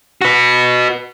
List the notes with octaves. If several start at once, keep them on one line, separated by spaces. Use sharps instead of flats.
F#4 B4